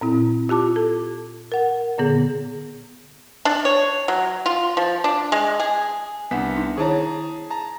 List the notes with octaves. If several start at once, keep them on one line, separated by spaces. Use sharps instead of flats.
A#2 C4 E4
F4 G4 A5 D6
A4
A#4 F#5
A#2 D3 B3 G#4
D4
C#5
F#3
F4
F3
D4
G#3
G#4
C2 B3 D4 F#5 G#5 B6
D#4
D#3 E4 G#4 C#5 A5 A#5
A5 A#5